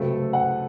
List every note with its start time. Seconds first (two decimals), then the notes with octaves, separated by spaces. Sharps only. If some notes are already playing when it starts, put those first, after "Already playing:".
Already playing: C#2 C3 F#3 A3 C4 A4
0.33 F#5